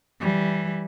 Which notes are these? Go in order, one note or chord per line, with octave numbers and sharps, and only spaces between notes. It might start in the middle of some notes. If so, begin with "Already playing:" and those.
E3 G3